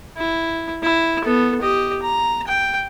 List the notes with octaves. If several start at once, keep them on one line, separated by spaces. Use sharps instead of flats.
E4
E4
B3 A4
G4 D#5
A#5
G5